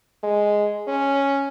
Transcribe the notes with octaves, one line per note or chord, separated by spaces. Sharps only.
G#3
C#4